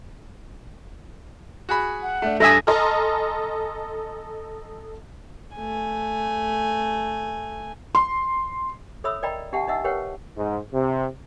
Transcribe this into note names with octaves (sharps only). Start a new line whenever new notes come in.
F#4 G#4 B5
F#5
A3 D4
G2 A4 E5 G#5 D#6 A#6
A4 D#5 G#5 A#5 C6 F6
A3 G#5
C6
A4 C#5 E5 B5 D#6 E6
A#4 D5 D#5 G5 A#5 B5
D4 G4 E5 F#5 A5
D4 D#4 D#5 E5 F#5 E6
G4 A#4 B4 C#5 F#5 G5
G#2
C3